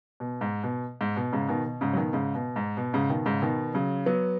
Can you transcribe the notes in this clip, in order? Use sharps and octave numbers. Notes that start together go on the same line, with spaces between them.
B2
G#2
B2
G#2
B2
G#2 C#3
B2 D#3
B2
G#2 C#3
F#3
B2 D#3
G#2 C#3
B2
G#2
B2
G#2 C#3
B2 D#3
G#2 C#3
B2 D#3
C#3 F#3
F#3 B3